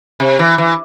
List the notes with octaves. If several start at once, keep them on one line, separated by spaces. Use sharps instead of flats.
C3
E3
E3